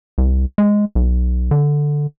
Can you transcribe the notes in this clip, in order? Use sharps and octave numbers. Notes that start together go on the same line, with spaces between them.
C2
G#3
B1
D3